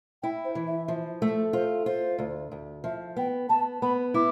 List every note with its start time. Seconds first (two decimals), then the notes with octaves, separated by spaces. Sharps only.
0.23 E4 G5
0.44 C5
0.55 E3
0.67 E5
0.88 F3
1.22 A3
1.53 F4 C5
1.86 F4 C5
2.18 D2
2.51 D2
2.84 F3 E5
3.16 B3 G5
3.49 B3 A5
3.82 B3 B5
4.14 E4 D6